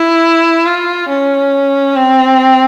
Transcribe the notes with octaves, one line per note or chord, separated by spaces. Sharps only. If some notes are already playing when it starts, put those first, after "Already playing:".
Already playing: E4
F4
C#4
C4